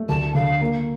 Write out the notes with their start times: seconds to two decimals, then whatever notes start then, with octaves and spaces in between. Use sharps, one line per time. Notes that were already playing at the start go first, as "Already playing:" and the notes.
Already playing: A3
0.09 D2 A5
0.35 D3 F5
0.61 A#3